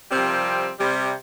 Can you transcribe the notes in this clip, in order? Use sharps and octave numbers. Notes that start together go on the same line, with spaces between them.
C3 F3 G3 C4 A#4
C3 G3